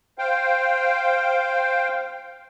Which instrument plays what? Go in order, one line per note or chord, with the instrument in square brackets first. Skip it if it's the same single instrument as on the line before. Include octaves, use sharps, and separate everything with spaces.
[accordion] C5 F5 G5